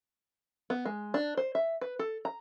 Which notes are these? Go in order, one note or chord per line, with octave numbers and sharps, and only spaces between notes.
B3
G#3
D4
C5
E5
B4
A4
A#5